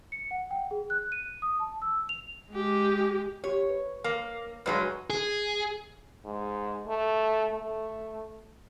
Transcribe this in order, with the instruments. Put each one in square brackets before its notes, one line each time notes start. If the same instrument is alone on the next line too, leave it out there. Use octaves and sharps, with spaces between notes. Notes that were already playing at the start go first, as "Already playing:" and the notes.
[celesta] C#7
F#5
G5
G#4
F#6
D#7
D#6
A5
E6
F7
[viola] G#3 G4
[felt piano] G4 [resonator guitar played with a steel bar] C#5
[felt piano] B4
[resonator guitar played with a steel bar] A#3
[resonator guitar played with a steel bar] G2 F#3 G#3 [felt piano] B4 A#5 F6
[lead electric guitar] G#4
[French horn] G#2
A3
A3